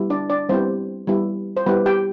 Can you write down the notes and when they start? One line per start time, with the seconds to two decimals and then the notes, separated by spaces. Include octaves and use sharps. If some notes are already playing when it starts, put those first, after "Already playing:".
Already playing: G3 B3 E4 G4
0.10 D4 D5
0.30 D4 D5
0.49 G3 B3 C4 E4 G4 C5
1.07 G3 B3 E4 G4
1.57 C5
1.66 G3 B3 E4 G4 B4
1.86 G4 G5